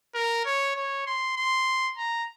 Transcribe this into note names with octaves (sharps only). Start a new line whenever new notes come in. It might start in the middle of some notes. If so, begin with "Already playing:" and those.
A#4
C#5
C#5
C6
C6
A#5